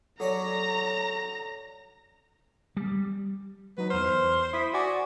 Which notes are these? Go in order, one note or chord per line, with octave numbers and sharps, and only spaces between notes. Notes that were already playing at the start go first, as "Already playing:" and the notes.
F#3 A4 C#5 D5 A#5 A#6
G3
F#3 D#4 B4
E2 C5 F6
E4 D#6 B6
F#4 D5 G#5 D6